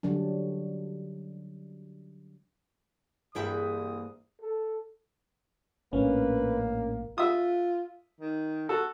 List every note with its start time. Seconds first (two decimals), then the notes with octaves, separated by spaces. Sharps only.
0.03 D3 F#3 G3 D4
3.35 C2 G2 E3 A#3 E4 G#4 G5 D#6
4.42 A4
5.93 A#1 A2 A#3 C#4 D4 B4 F5
7.18 F4 E5 D#6
8.21 D#3
8.69 F#4 A4